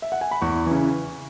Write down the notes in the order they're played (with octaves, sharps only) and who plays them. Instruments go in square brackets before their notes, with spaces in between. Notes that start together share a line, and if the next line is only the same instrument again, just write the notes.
[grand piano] E5
F#5
G#5
B5
E2 C#6
C#3 E3